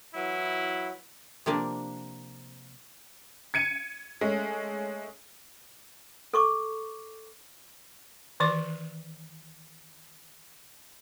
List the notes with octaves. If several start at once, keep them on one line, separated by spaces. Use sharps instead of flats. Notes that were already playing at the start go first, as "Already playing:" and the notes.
E3 F#3 E4
C3 F3 A#3 D4
G#6 C#7 D#7
G#3 A3 C#4
A4 C#6 D6
D#3 E3 D5 D6